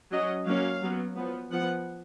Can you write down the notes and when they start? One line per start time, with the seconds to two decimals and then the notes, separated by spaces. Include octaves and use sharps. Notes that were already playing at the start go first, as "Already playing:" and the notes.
0.11 F#3 C#4 D#5
0.46 F#3 A#3 C#4 F5
0.82 F#3 B3
1.17 F3 B3
1.51 F3 B3 F#5